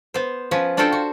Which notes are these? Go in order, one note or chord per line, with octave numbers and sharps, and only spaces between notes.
B3 C5
F3 C#4 B4
D4 F4 F#4 A4 C5 G5
F#4